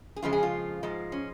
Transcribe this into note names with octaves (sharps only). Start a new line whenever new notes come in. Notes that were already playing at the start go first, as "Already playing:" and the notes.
G#4
F2 C#3 F3 G#3 F4
G#4
F4
G#2 F3 G#3
C#4